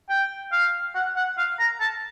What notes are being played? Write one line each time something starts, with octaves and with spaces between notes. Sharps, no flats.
G5
F5
F#5
F#5
F5
A#5
A5